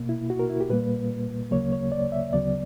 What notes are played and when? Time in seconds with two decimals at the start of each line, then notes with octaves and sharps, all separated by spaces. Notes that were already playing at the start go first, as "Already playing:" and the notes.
Already playing: B2 A#3
0.09 E4
0.30 F#4
0.39 A#4
0.50 E4
0.60 G4
0.70 A#2 G3 A#3 B4
1.51 D2 C#3 F#3 A#3 C#5
1.72 C#5
1.92 D5
2.12 E5
2.33 D2 C#3 F#3 B3 D5